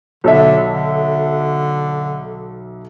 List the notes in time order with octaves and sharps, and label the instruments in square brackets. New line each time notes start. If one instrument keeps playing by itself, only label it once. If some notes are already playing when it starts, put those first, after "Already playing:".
[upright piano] B1 A4 E5 [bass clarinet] D3
[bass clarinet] D3